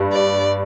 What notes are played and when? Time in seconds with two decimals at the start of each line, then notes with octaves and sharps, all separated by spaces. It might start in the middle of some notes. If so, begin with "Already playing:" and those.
Already playing: G2
0.12 D5